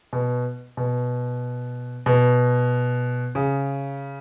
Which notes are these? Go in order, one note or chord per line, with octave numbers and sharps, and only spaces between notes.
B2
B2
B2
C#3